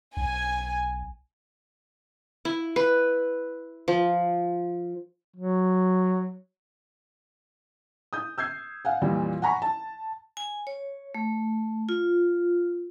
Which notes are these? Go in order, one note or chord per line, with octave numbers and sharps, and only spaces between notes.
B1 G#5
E4
B4
F3
F#3
D#6 G6
E6 G6 G#6 C7
F5 F#5 G#5
F2 A#2 E3 F3 G3
F#5 G#5 A#5 B5 C#6
A5
G#5
C#5
A3
F4